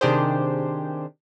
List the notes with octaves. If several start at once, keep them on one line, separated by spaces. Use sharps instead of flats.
C3 D#3 D4 G4 G#4 C5